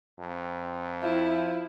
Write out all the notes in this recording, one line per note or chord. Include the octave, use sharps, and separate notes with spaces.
F2
F3 E4